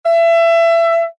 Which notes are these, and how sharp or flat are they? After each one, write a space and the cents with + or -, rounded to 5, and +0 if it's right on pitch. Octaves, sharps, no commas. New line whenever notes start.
E5 +25